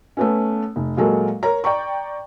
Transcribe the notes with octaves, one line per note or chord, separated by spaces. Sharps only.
A3 B3 C#4
F1
A#2 F#3 G#3 A4 A#4
A#4 C#5 A#5
D5 G5 A#5 C#6